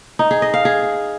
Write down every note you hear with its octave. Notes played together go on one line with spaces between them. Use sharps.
D#4
G#4
D#5
F5
G#4